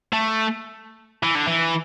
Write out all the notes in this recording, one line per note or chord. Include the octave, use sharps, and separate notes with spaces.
A3
E3
D3
E3